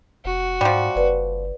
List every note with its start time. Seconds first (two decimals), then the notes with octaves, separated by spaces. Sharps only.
0.25 F1 F#4
0.61 G#2 F3 G3
0.95 F#1 B4 D5